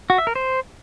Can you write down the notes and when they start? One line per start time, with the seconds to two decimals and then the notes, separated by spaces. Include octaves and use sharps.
0.10 F#4
0.18 E5
0.27 A#4
0.36 C5